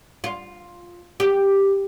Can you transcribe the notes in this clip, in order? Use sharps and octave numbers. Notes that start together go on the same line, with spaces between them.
F4
G4